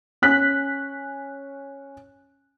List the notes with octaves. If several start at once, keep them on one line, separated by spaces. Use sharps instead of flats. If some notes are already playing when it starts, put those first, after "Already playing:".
C#4 F#6 B6